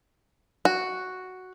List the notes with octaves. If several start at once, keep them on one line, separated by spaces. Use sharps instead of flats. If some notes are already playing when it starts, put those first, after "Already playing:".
F#4